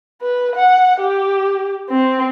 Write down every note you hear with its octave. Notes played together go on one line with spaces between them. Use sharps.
B4
F#5
G4
C4